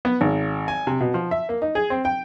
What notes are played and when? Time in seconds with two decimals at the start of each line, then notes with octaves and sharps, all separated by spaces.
0.05 B3
0.21 G#1
0.68 G#5
0.87 C3
1.00 B2
1.14 F3
1.31 E5
1.49 A#3
1.62 D#4
1.75 G#4
1.90 C4
2.05 G5